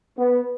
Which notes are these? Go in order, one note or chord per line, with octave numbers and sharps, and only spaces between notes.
B3